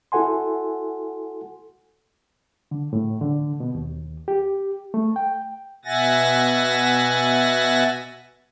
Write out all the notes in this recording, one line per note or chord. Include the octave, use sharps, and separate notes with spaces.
E4 F#4 A4 F#5 G#5 C6
D3
A2
D3
B2
D#2
G4
A3
G5
B2 E5 F#5 G#5 A6 A#6